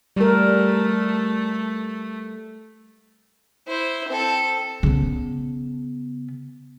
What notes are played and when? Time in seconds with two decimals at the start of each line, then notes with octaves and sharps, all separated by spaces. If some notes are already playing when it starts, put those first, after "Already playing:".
0.16 G3 A3 A#4
3.67 E4 C5
4.08 C4 A4
4.83 C#3 B3